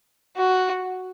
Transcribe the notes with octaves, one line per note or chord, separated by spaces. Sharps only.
F#4